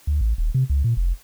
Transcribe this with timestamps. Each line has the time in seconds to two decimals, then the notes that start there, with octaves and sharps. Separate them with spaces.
0.07 D2
0.21 A1
0.38 D#1
0.54 C3
0.70 C#2
0.84 A#2
0.97 F1